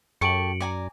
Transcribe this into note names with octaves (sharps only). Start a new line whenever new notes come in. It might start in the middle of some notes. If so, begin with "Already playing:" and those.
F#2 G4 A4 C#6 C#7 D7 F#7
D5 G#5 A#5